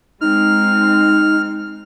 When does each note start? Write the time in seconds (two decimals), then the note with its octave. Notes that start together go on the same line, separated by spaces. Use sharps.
0.21 G#3 C4 D#4 F6